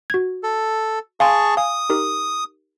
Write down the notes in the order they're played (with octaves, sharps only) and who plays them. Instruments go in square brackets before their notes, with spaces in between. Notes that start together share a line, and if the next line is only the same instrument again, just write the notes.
[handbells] F#4 G#6
[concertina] A4
[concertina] G#4 A5 C#6 [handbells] F5 G#5 C6
[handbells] F5 G#5 [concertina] D#6
[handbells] D#4 G4 A#4